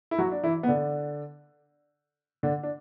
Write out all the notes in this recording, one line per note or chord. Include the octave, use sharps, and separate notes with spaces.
E4
F#3 F#4
D4
E3 E4
B3
D3 D4
D3 D4
D4